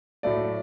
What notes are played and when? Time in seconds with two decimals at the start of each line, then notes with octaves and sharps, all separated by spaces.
0.23 A2 F#3 A3 D5